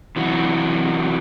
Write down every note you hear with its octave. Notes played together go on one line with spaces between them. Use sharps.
C3 E3 F#3 F#4